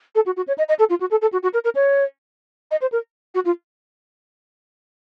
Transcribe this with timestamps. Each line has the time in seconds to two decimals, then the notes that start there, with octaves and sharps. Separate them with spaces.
0.15 A4
0.26 F#4
0.37 F#4
0.48 C#5
0.58 D#5
0.69 D#5
0.79 A4
0.90 F4
1.00 F#4
1.11 A4
1.22 A4
1.33 F#4
1.43 F#4
1.54 A#4
1.64 A#4
1.75 C#5
2.71 D#5
2.82 C5
2.92 A#4
3.35 F#4
3.45 F4